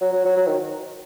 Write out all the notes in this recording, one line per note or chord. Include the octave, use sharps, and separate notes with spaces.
F#3
F#3
F#3
F#3
D#3